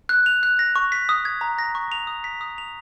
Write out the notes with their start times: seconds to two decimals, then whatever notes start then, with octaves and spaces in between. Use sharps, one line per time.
0.09 F#6
0.26 F7
0.43 F#6
0.59 A#6
0.76 C#6
0.92 B6
1.09 D#6
1.25 G#6
1.41 A#5
1.59 A#6
1.75 C#6
1.92 F7
2.07 D#6
2.24 B6
2.41 D#6
2.58 F7